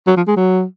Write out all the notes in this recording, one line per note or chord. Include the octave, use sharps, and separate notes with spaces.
F#3
F3
G#3
F#3